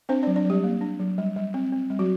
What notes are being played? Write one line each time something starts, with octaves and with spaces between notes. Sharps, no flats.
C4 D4 C5
F#3 D4 D5
D4 D5
F#3 G3 G4
A#3
D4
F#3
G3
G3
C4
C4
G3
F#3 F#4